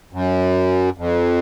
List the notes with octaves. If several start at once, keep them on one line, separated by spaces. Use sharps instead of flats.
F#2
F2